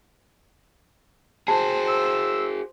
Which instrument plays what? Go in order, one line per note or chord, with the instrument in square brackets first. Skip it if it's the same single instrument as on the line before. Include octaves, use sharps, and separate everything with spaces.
[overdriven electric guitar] F#4 G#4 [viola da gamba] C5 [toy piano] A5
[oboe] E6